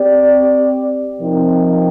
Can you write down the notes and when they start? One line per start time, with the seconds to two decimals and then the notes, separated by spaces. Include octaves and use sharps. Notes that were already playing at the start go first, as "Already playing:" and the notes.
Already playing: C4 G4 D5
1.19 C3 F3 C4 D#4 A#4